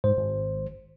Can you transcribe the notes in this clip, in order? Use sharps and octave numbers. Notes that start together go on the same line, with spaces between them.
G#2 C5
G#1